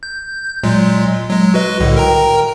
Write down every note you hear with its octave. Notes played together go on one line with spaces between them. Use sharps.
G6
A#2 F#3 G#3
F#3 G#3
F#4 B4 D#5
C2 A2 D3
A#4 G5 A#5